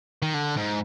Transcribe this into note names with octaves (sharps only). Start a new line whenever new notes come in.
D#3
D3
G#2